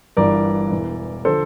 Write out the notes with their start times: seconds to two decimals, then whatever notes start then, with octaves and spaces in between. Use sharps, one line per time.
0.17 G1 G2 E3 A#4 D5
0.71 E1 E2 E3
1.25 D3 F3 A4 C5